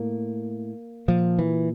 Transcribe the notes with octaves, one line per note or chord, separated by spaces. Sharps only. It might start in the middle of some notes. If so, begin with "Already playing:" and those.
Already playing: A2 A#3
A#2 F3
E3